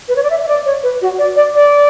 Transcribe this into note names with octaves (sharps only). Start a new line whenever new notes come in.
B4
C#5
D5
E5
E5
D5
C#5
B4
F#4
D5
D5
D5